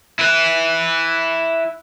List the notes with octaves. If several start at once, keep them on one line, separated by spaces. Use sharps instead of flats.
E4 B4